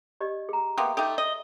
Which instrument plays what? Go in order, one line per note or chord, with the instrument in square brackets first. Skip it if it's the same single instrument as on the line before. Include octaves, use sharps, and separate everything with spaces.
[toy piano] G4 D5 D#5
G#4 A#5
[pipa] A#3 B3 G4 [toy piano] E5 C6
[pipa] A3 D#4 G4 [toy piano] A4 E5
[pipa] D#5